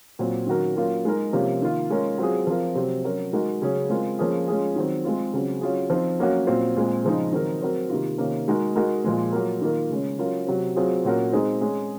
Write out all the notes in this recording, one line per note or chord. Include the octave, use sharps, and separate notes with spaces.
A#2 F#3 C4
D#3 F#3 C#4 F#4 A#4
F#3 A#3 C#4 F4 A#4
G#3 D#4 A#4
C3 F3 A#3 C#4 F4
D#3 A#3 F4
G#3 C#4 F4 A#4
F#3 C4 F4 G#4
F3 C4 F4 A#4
C3 F#3 C4
F#3 C#4 F#4 A#4
G#3 D#4 F#4 A#4
C#3 F#3 C#4 G#4
G#3 C4 F4 A#4
F3 A#3 C#4 G#4
G#3 C#4 F4 G#4
D#3 F#3 C4
G#3 C4 F4
C#3 F#3 C4
F#3 C#4 F4 G#4
F3 C4 D#4
F#3 A#3 C#4 F#4 A#4
A#2 F#3 C4 F4
A#2 G#3 C4
C#3 F3 G#3 D#4
D#3 F#3 C4 D#4 A#4
F#3 C4 F#4 A#4
C3 D#3 A#3 F4
C3 D#3 A#3 C#4
G#3 D#4 F#4 A#4
G#3 D#4 F#4 A#4
A#2 F3 G#3
F#3 A#3 F4 A#4
D#3 A#3 F4 A#4
C#3 G#3 C#4
F#3 C#4 F4 A#4
C3 F#3 C4
F#3 C4 F4 G#4
A#2 F#3 C#4 F#4 A#4
G#3 C4 D#4 G#4
G#3 C#4 G#4